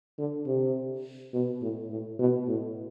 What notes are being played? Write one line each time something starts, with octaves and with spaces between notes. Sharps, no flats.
D3
C3
B2
A2
A2
B2
A2